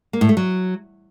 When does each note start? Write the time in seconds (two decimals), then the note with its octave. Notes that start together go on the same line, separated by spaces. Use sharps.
0.13 A#3
0.21 A2
0.29 A3
0.37 F#3